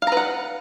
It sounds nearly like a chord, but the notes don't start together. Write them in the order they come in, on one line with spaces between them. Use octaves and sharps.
F5 A#5 B4 F#5